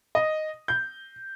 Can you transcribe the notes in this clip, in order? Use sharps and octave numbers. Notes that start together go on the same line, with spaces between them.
D#5
G6